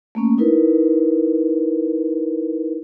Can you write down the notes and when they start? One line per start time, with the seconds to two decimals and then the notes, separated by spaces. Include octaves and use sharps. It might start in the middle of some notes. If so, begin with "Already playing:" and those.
0.15 A3 A#3 C#4
0.38 D#4 E4 A#4 B4